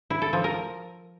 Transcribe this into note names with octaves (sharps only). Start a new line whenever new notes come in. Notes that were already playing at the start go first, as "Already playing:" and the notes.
E4
A4
F3
A#4